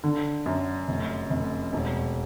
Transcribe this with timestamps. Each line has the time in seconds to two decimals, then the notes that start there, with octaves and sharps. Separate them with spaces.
0.04 D3
0.46 F#2
0.88 F1
1.30 F1
1.73 E1